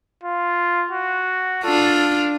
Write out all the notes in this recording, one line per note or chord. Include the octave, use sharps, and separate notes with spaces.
F4
F#4
D4 F4 A4